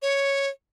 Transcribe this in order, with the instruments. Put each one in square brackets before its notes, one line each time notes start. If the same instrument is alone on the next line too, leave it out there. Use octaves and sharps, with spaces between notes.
[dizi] C#5